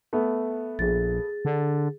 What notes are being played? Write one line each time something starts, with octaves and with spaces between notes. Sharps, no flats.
A3 B3
A#1 G#4 A6
D3